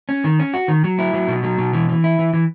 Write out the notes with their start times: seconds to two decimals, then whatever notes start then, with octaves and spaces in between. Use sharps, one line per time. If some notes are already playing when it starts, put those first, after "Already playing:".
0.09 C#4
0.24 D#3
0.39 C#4
0.54 F#4
0.68 D#3
0.84 F#3
0.99 E4
1.14 F#3
1.28 B2
1.44 F#3
1.59 B2
1.73 E3
1.89 E3
2.04 E4
2.19 E3
2.34 E3